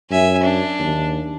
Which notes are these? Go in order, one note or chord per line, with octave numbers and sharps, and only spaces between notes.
F#2 E5 G#5
D4
D#2